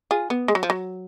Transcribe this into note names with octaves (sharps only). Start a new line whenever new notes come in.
F4 G#4
B3
G#3
F#3
F3
F#3